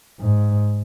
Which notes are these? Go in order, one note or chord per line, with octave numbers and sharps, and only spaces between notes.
G#2